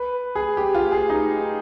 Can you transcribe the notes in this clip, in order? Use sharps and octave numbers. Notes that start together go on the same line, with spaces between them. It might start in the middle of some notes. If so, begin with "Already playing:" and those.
Already playing: B4
G#4
G4
F4
G#4
D#4